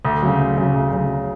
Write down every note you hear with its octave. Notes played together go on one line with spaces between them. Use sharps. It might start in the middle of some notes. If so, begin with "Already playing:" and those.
D2
C#3 F#3
D2
C#3 F#3
D2
C#3 F#3